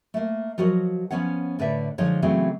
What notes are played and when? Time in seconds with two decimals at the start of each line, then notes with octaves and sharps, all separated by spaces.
0.14 A3 A#3
0.58 F3 F#3 F#4 A#4 D#5
1.11 F3 B3 C#4 C#5 F#5
1.59 A2 D3 B4 D5 E5
1.98 D3 F3 G#3 D#4 C#5
2.22 C#3 E3 F#3 A3 B3 C4